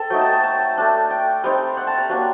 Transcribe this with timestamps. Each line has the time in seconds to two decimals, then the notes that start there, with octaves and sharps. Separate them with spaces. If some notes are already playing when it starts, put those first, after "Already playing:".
Already playing: C4 A4
0.10 F#3 A3 D#4 G5
0.21 A5
0.33 A5
0.43 A5
0.78 A3 D4
1.10 G5
1.44 G3 C4 D#4 G5
1.77 F#5
1.87 A5
1.98 A#5
2.09 F#3 A#3 D4